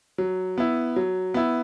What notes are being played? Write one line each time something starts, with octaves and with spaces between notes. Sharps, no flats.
F#3
B3 E4
F#3
B3 E4